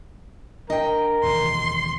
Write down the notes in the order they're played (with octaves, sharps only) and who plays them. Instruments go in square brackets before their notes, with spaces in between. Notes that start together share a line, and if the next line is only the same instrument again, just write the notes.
[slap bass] D4 [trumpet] A#4 [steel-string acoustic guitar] D#5 G5
[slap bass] E1 D#2 [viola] C6